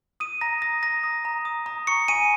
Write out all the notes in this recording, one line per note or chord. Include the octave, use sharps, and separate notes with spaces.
D#6 D#7
A#5 A#6
D#6 A#6
A#5 A#6
D#6
A#5
D#6
A#5
C#6 C#7
G#5 D#7